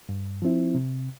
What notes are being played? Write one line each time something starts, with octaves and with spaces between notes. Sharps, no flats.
G2
F3 C4 E4
C3